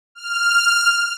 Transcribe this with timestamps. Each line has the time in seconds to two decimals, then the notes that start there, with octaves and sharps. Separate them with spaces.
0.15 F6